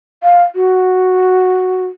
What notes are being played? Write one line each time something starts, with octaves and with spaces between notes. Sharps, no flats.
F5
F#4